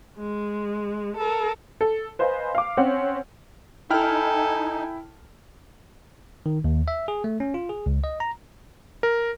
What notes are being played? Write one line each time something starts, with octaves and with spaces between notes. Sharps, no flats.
G#3
A4 A#4
A4
B4 C5 D#5 F5 G#5 C6
F5 D6
C4 C#4 F#5
D#4 E4 A4 G5 G#5 F6
D#3
D#2
E5
G#4
A3
C#4
F4
G#4
C#2
D#5
A#5
A#4